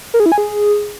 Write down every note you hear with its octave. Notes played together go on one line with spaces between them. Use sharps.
A#4
G#4
E4
G#5
G#4